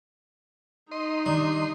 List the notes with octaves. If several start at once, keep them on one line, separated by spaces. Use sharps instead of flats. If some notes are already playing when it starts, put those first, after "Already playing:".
D#4 D#5 C6
D#3 G3 D4